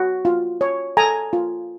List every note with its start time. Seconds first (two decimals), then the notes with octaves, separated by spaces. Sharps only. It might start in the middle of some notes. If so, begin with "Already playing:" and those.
Already playing: F#4
0.25 F4
0.61 C#5
0.97 A4 G#5 A#5
1.33 F4